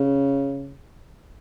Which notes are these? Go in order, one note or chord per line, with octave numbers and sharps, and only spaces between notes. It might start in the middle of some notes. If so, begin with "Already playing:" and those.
Already playing: C#3